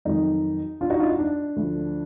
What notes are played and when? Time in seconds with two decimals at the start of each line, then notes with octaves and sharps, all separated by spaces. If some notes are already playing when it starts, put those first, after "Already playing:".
0.05 F2 D#3 F#3 D#4
0.81 D4 F4
0.90 D#4 F#4
0.99 D4 F4
1.10 D#4
1.19 D4
1.56 D2 D3 F3